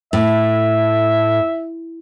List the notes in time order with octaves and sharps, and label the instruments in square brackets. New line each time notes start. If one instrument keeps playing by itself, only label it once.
[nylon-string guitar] A2 [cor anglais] E5